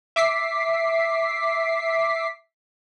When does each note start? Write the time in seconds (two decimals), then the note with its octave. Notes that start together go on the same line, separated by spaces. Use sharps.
0.16 E5 D6 B6 C7